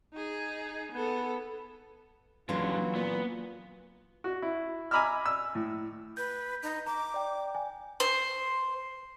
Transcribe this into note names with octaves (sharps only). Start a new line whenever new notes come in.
D#4 G#4
B3 A4
D#1 A#2 D3 E3 F#3 C#4 F4
A#2 B3
F#4
E4
G#5 A#5 B5 D6 E6 F6
E6
A2
B4 G6
D#4
A#5 D6
D5 G5
G#5
C5